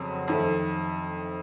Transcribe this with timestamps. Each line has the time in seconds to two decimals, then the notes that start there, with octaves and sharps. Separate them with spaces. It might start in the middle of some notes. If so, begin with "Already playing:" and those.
Already playing: F2 C#3 F#3 C4
0.28 F2 D#3 A3